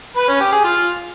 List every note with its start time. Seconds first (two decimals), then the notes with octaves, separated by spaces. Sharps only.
0.17 B4
0.29 C#4
0.40 G4
0.52 G#4
0.64 F4